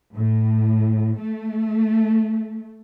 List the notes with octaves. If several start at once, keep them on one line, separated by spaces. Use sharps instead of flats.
A2
A3